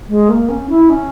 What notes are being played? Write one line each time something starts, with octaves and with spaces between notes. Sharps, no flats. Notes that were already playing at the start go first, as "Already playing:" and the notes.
G#3
A#3
C#4
E4
C#4